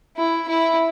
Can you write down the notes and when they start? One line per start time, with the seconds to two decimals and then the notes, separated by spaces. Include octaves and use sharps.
0.17 E4
0.48 E4